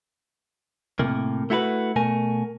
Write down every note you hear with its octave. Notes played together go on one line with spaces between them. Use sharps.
A2 C3 A#3
A3 E4 F#4 A#4 B4
B2 A3 A#4 G#5